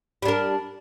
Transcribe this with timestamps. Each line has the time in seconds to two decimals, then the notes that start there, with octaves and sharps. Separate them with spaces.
0.22 G3
0.25 D4
0.28 A#4